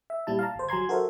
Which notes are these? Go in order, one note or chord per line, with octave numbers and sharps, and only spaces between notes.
E5
A#2 G3 E4 A5
F5 A5 A#5
G1 C5
F#3 G#5 A#5 C6 G#6
F#4 A4 A#4 C5 E5